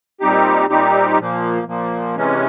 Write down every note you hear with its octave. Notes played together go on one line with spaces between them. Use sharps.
A#2 G3 C4 D#4 G4
A#2 G3 C4 D#4 G4
A#2 F3 A#3
A#2 F3 A#3
C3 E3 G#3 C#4